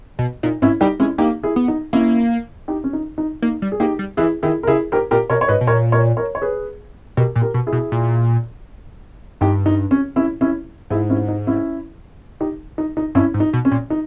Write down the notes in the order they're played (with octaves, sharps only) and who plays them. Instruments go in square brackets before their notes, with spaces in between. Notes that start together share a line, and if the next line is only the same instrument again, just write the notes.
[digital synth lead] B2
[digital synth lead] A#2 [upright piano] D#4
[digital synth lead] G#2 [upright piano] C#4 E4
[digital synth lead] G3 [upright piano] D#4 G4
[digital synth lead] G#3 [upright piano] C#4 E4
[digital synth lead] A#3 [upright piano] D#4 G4
[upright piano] E4 G#4
[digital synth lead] B3
[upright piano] D#4
[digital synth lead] A#3 [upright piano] C#4 E4
[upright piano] D#4 G4
C#4
D#4
D#4
[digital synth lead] A#3 [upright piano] D#4
[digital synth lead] G3
[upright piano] G#4
[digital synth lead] A#3 [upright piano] D#4 G4
[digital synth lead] G3
[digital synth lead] E3 [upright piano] E4 G#4
[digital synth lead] D#3 [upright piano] E4 G#4
[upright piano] A#4
[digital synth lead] C#3 [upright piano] E4 G#4
[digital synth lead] G#2 [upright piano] G4 A#4
[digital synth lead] A#2 [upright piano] G4 A#4
[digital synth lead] B2 [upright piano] A#4 C#5
[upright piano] C#5
[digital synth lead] G#2 [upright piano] B4 D#5
[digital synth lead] B2
[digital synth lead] A#2 [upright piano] A#4 C#5
[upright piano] A#4 C#5
A#4 C#5
C#5
G#4 B4
[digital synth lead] B2 [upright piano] G4 A#4
[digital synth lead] A#2
[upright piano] G4 A#4
[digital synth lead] B2
[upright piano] E4 G#4
[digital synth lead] B2
A#2
[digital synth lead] G2 [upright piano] D#4 G4
[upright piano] D#4
C#4
C#4 E4
C#4 E4
[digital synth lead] G#2 [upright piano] E4 G#4
[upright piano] C#4 E4
D#4
C#4 E4
D#4 G4
D#4
D#4
[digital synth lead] G2 [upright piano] C#4 E4
[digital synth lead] G#2
[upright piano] D#4
[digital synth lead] B2
[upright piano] C#4
[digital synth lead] A#2
[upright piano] D#4